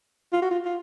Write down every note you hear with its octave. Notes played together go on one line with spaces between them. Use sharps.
F4
F#4
F4
F4